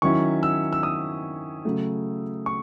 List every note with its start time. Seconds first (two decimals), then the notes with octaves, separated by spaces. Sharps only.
0.02 D#3 F#3 C#4 E4 C#6
0.43 E6
0.73 E6
0.83 D#6
1.65 C#3 F#3 A3
2.46 C#6